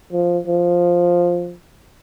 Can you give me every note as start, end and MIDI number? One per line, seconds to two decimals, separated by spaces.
0.13 0.38 53
0.47 1.54 53